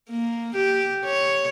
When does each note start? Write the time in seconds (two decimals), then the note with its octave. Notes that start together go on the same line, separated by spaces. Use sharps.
0.10 A#3
0.55 G4
1.05 C#5